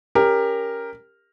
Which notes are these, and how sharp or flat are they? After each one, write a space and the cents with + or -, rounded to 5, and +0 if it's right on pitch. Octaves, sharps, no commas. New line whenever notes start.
C#4 +20 G4 +20 A#4 +0